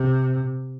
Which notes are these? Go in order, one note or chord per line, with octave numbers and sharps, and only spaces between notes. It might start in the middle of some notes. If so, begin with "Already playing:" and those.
Already playing: C3